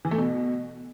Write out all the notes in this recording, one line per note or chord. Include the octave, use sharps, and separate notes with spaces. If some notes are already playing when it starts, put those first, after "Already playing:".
E3
A3
B2